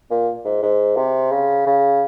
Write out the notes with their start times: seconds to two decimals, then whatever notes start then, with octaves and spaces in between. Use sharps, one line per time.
0.11 A#2
0.45 G#2
0.63 G#2
0.97 C3
1.31 C#3
1.67 C#3